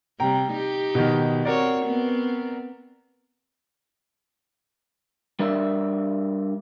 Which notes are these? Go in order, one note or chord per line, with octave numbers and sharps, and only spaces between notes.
C3 G3 G5 A#5
D#4 G4
B2 D#3
C4 F#4 A#4 C#5 D5
B3 C4
G3 D4 A#4 D5 E5